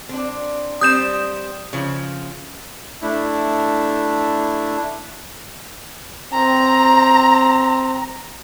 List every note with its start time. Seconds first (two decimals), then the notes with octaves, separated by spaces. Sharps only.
0.09 C4 D4
0.81 G3 C4 D#6 G6 E7
1.73 C#3 F3
3.02 A3 D4 E4
6.33 C4 A#5